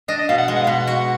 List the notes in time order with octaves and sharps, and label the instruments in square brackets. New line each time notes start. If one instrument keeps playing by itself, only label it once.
[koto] D4 [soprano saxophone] D#5
[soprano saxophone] D#5
[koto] B2 [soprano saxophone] F5
[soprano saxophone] F#5
[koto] G#3
[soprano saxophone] F#5
F5
[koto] B2 [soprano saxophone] F#5
[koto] F#4